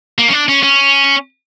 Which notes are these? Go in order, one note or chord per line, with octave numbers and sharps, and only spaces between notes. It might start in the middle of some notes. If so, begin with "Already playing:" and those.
A#3
C#4
D4
C#4
C#4